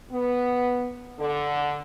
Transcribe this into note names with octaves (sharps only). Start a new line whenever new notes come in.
B3
D3